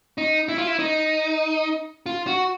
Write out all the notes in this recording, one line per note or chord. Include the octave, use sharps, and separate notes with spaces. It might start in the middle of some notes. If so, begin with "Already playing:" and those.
D#4
E4
F4
E4
D#4
F4
F#4